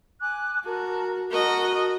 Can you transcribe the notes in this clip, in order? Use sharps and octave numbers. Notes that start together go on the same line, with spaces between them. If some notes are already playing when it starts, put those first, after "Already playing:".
G#5 D6 F#6
F#4 A#4 A5
F#4 A#4 D#5 A5